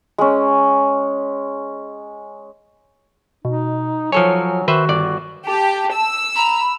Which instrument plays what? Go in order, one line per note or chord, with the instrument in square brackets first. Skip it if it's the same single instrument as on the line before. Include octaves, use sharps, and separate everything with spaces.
[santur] G#3 C#4
[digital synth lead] B2 [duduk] D#4
[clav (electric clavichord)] F3 A4 C#5 [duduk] F#3 [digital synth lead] G#5
[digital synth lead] D#3 [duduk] F#4 [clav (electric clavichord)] B4 C5 E5
[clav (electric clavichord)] G1 D5
[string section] G4 [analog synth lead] A5
[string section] E6
[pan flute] A#5 [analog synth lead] B5